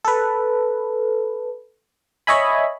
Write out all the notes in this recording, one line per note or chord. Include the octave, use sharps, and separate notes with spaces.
A4 B4
C#5 D#5 E5 G#5 B5